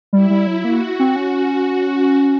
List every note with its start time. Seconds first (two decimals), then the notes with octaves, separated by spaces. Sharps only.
0.13 G3 E4
0.30 G3
0.47 F#3
0.64 A#3 F#4
0.99 C4
1.16 C#4